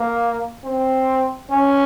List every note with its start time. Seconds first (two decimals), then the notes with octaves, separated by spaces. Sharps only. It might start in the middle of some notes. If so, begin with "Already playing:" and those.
Already playing: A#3
0.64 C4
1.50 C#4